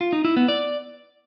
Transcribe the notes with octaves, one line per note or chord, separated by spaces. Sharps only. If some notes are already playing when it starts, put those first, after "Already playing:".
F4
D#4
E4
B3
D5